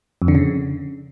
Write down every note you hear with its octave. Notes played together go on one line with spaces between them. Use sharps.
F2
D3
C#3